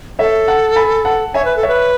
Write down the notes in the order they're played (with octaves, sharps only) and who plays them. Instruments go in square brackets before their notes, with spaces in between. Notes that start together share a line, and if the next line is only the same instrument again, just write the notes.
[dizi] A4 [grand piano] C#5 E5
[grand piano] F#5 A5
G#5 B5
F#5 A5
[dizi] C#5 [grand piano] E5 G#5
[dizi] B4
A4
[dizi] B4 [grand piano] C#5 E5